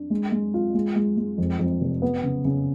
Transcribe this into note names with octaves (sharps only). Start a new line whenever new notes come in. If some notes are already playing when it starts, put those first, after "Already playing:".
Already playing: D4
G#3
G#3
F4
G#3
G#3
G#3
F2
F2
F1
B3
C#3
C#3